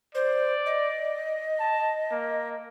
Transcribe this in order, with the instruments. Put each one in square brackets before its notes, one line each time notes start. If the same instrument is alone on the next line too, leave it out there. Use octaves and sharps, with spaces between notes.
[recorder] C5 [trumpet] D5
[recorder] D#5
[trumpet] A5
A#3